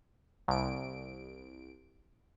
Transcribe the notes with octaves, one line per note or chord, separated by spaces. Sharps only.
C2 D7